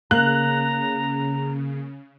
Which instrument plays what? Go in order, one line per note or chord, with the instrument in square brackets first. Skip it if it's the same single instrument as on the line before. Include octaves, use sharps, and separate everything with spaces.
[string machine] C#3 [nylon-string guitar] A#3 [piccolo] A#5 [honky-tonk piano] F#6